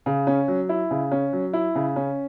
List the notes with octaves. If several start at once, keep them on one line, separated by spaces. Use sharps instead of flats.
C#3
C#4
F#3
E4
C#3
C#4
F#3
E4
C#3
C#4